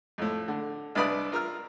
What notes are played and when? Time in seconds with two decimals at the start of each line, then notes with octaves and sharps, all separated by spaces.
0.18 F2 A2
0.48 D3
0.95 C2 D4 B4 D5 B5 D#6
1.32 F4 A#4 E6 F6